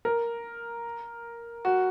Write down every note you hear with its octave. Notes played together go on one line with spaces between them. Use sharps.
A#4
F#4